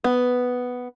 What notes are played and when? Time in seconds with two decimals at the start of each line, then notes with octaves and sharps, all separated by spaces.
0.04 B3